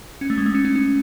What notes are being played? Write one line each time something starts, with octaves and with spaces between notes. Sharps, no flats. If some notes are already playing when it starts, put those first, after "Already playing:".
C#4
A3
G#3
A3
C#4
C#4
C#4